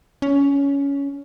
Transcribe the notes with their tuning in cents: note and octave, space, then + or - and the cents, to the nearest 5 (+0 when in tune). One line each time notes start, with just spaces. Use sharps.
C#4 +15